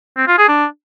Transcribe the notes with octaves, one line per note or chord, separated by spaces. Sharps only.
C4
F4
G#4
D4